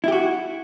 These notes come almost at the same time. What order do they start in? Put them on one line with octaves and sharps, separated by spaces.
E4 G4 F#4